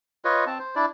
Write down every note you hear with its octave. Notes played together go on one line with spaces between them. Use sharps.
F4 B4 C#5 D#5
C4 A5
C5
D4 E4 D5